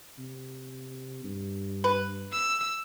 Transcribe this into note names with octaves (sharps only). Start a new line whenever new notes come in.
C3
G2
B4
E6